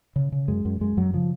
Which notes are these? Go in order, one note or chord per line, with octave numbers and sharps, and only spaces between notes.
C#3
C#3
F#2 G#3
F#2
F#2 G#3
F#2 F#3
C#3 F3